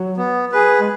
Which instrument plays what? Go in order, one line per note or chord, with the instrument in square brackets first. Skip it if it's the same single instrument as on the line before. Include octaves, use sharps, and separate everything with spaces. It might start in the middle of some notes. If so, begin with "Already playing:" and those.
Already playing: [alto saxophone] F#3
[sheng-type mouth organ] B3
G#4 B4
[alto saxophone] G#3